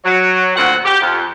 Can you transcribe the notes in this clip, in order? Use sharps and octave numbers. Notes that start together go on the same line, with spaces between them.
F#3
D2 A#2 C4 F#4 F#5
G4
F2